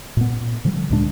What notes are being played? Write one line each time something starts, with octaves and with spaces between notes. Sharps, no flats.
A#2 B3
D3 F3 G3
D2 A#2 G#3 D4